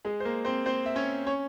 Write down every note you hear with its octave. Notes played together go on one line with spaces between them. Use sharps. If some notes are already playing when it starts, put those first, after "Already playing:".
G#3 G#4
C5
A#3 A#4
C4 C5
C4 C5
E5
C#4 C#5
C#4 C#5